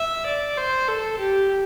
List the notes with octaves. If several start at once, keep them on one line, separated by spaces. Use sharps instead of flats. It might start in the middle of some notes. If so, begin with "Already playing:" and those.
Already playing: E5
D5
C5
A4
G4